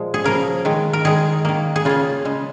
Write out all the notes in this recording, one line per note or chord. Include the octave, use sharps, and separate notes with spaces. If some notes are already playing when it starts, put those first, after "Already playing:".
Already playing: A#2 F3 G#3 A#4
G#4
C#3 F3 A#3 A#4
D#3 G#3
A#4
D#3 G#3 G#4
D#3 A#3
G#4
C#3 A#3 F4
C#3 G#3